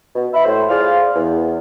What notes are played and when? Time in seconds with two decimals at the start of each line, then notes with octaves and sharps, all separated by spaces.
0.16 B2
0.33 E5 B5
0.45 A2 C5
0.69 F4 G#4 C5 D5 F5
1.15 E2